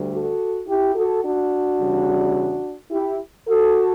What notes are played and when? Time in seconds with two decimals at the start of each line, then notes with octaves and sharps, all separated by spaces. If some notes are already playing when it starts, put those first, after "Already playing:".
Already playing: D2 D3 G3
0.11 F#4 A4
0.67 E4 G4
0.95 F#4 A4
1.23 D4 F#4
1.79 E2 C#3 G3
2.91 E4 G4
3.48 F#4 A4